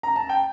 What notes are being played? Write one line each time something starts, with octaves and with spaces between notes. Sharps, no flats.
A#5
A5
G5